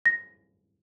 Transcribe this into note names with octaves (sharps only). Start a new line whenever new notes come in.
A#6